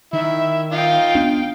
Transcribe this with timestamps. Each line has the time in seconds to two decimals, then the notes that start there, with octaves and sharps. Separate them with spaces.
0.13 D#3 E4 E5
0.72 D#4 F4 F5 G5
1.15 B3 D4